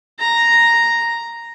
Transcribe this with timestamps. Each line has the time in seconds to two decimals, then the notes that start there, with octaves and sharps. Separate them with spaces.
0.20 A#5